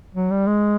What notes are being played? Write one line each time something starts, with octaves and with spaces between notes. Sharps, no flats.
F#3
G3
G#3